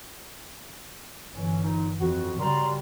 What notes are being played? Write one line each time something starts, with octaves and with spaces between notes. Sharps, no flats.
G1 E3 C#4
A#2 D#4
F2 F#4
C#3 G3 F#4 A#4 D5 A#5 C6